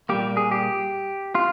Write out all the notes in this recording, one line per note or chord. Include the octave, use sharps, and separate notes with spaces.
A#2 G3 A#3 G4
G#4
G4
F4